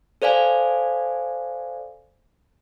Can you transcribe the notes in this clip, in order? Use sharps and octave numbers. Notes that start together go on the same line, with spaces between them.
A4 C5 D5 F5 G#5